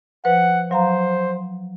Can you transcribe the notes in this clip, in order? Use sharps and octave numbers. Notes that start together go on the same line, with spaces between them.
F3 B4 C5 F#5
F#3 C5 F5 A#5